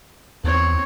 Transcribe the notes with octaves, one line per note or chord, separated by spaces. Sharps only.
E2 C4 C#5